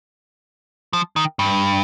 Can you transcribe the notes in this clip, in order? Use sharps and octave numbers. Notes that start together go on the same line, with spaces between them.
F3
D#3
G2